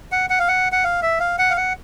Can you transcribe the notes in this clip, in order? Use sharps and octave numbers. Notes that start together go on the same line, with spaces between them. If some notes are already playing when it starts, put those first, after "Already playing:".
F#5
F#5
F5
F#5
F#5
F5
E5
F5
F#5
F5
F#5